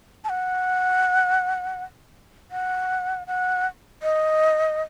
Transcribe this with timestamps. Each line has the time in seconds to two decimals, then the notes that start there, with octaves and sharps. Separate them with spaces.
0.24 A5
0.29 F#5
2.51 F#5
3.27 F#5
4.03 D#5